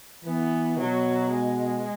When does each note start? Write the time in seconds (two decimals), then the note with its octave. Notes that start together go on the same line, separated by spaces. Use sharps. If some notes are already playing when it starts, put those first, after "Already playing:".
0.25 E3 B3
0.79 B2 F#3
1.32 G#3